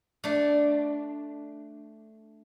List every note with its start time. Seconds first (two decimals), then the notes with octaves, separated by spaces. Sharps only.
0.24 A3 D4